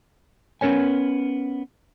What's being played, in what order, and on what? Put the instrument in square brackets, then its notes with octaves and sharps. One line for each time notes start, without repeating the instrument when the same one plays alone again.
[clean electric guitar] B3 C#4 A#4 C#5 G#5